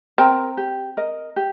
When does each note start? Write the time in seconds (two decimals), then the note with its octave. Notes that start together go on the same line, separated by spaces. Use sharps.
0.18 C4 A#4 G5 A#5
0.57 G4
0.97 A#4 D#5
1.36 G4